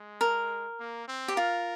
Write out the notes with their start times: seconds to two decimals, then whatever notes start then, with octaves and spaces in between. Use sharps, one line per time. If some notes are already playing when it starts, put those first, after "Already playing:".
Already playing: G#3
0.21 A#4
0.79 A#3
1.08 C4
1.28 G4
1.36 F4 A#4